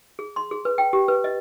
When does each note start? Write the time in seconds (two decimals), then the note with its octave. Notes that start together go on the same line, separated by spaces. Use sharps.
0.19 G#4
0.36 C6
0.51 G#4
0.65 B4
0.78 G5
0.93 G4
1.08 B4
1.24 D#5